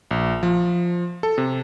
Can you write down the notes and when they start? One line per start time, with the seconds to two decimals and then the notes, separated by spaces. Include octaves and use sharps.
0.11 A#1
0.43 F3
1.23 A4
1.38 C3